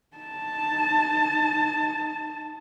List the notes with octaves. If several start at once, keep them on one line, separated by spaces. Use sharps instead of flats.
D#4 A5